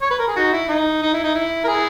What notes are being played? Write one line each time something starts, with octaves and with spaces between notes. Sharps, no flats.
C#5
B4
A#4
G#4
D#4 F#4
E4
D#4
D#4
E4
D#4
E4
A#4
E4 G#4